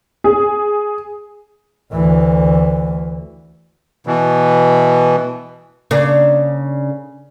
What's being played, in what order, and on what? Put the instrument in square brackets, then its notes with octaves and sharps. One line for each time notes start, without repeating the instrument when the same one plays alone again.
[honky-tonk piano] G#4
[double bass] D2 E3
[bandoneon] B2 E3
[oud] C#3 A#3 D4